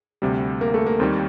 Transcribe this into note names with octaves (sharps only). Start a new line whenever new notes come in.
D2 C3 G3
A#3
A3
A#3
D#2 D#3 G3 C4